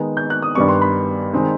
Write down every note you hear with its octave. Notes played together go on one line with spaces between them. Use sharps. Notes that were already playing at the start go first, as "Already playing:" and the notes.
Already playing: D#3 G#3 B3 D#4
G6
F#6
D#6
G2 D#3 G3 B3 D4 C#6
C6
B5
D#3 G#3 C4 D#4